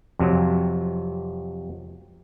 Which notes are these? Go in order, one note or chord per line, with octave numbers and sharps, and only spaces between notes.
F2 C3 F#3